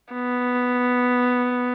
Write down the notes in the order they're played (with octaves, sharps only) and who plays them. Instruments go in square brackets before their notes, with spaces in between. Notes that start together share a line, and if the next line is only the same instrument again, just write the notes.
[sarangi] B3